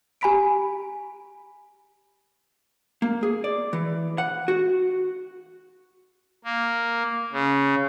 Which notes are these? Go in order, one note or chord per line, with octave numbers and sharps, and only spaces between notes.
G4 G#5 A#5 B5 B6 D7
A#3
G#4
D5
E3
F#5
F#4
A#3
C#3